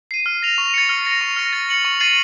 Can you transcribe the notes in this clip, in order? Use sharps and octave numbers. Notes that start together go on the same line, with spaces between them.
C7 D#7
F6
A#6 F7
C#6
A6 C#7
F6
A#6 C#7 F7
C#6
F6 A#6
A6
C#7 F#7
C#6
A6 C7 D#7 F#7